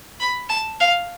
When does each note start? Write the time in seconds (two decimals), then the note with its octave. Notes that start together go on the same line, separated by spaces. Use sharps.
0.20 B5
0.49 A5
0.80 F5